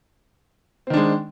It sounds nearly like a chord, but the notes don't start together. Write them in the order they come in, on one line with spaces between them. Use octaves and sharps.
C4 D#3 D4 G#3